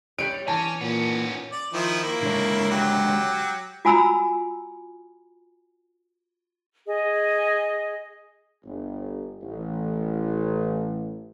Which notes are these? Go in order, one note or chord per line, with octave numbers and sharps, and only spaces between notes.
G3 C#5 D7
E3 C#4 A5
A#2 B3 C#4
D5
D#3 F3 E4
A#3 E4
D3 G#3 C#5
F#3 G4
F4 F#4 G#5 A#5 B5 E6
G#4 D#5
G1
A1